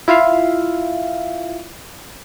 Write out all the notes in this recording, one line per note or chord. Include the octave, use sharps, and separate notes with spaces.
E4 F4 E5 F5